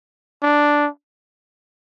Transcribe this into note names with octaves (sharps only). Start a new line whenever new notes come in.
D4